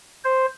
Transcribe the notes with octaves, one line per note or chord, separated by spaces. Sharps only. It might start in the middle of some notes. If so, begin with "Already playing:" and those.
C5